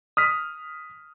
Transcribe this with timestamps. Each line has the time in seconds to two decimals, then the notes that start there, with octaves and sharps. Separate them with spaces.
0.17 D#6 F6 B6